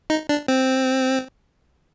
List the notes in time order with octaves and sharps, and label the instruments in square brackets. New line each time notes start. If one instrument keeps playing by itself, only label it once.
[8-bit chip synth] D#4
D4
C4